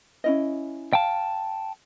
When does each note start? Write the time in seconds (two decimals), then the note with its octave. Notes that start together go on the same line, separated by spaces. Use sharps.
0.24 C#4 E4 D#5
0.93 F5 G5 A5